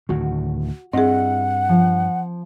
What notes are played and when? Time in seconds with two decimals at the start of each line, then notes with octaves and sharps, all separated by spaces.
0.09 D2 A2 D#3 F#4
0.93 G2 C4 E4 G#4 D#5 F#5
1.69 F3